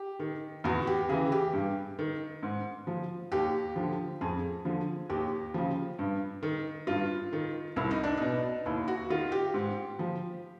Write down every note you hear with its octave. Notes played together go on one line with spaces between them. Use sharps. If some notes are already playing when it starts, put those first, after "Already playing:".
Already playing: G4
D#3
E2 F#4
G4
C#3 E3 G#4
G4
G2
D#3
G#2
F3
D#2 G4
D3 F3
F2 G#4
D3 F3
D#2 G4
C#3 F3
G2
D#3
G2 F4
D#3
C2 E4
D#4
D4
B2 D#4
D#2 E4
F#4
D#3 F4
G4
G#2
F3